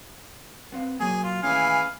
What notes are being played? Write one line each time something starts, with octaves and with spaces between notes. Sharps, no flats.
B3 C4 F5
B2 F#3 A#3 G#4
F4
D#2 A2 E3 C#4 G#4 F5